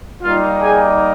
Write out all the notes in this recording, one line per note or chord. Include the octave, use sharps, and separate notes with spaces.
G3 A#3 D#4 F4 F5
G#4 G#5